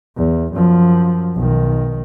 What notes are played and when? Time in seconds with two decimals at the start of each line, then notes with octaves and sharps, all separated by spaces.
0.16 E2
0.53 F#2 F3
1.35 B1 D#3